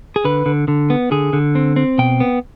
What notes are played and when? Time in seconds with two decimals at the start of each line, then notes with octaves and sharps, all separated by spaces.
0.16 G#4
0.25 D3 B4
0.46 D3
0.68 D3
0.90 B3
1.11 D3 G#4
1.33 D3
1.55 C4
1.76 C4
1.98 B2 G5
2.20 B3